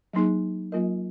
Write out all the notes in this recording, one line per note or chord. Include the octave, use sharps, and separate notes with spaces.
F#3 A#3 D#4 G#4
F#3 A#3 F4 A#4 D#5